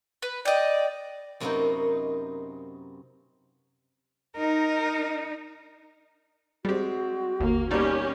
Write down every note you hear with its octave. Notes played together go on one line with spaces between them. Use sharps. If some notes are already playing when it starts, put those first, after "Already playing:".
B4
D5 D#5 G5
F#2 C3 A#3 B3 C#4 D#4
D#4 A#4
G3 G#3 C4 F#4 G4
G1 D#2 A#3
B2 G3 A#3 C#4 D#4 G4 D5